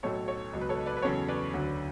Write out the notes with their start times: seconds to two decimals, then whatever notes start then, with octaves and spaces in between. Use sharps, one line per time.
0.03 B1 A2 F#3 A4 C#5
0.28 A4 C#5
0.53 C#2 B2 F#3
0.61 B4
0.69 A4 C#5
0.86 B4 D5
0.97 B4
1.02 E2 C#3 F#3 A4 C#5
1.28 B4 D5
1.53 D2 D3 F#3